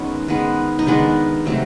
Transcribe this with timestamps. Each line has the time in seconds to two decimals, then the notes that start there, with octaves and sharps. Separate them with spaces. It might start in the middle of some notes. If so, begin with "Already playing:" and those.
Already playing: D#3 G#3 B3 C#4
0.28 D#3 G#3 B3
0.79 D#4
0.87 D#3 G#3 B3 D4
1.45 C3 D#3 F#3 A3